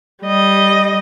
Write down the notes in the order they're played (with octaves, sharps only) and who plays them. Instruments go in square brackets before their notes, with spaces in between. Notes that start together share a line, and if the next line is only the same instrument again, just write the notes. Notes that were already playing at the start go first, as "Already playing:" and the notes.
[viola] G3 D#5